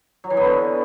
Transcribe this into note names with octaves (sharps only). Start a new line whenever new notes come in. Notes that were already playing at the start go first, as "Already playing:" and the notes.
F#3
E3
B3
D3